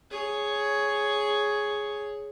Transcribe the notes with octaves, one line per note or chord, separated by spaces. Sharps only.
G#4 C#5